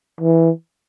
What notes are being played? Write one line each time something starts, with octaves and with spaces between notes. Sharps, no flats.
E3